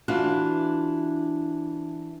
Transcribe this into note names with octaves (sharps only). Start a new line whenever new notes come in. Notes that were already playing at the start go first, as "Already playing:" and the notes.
E3 D4 F4 F#4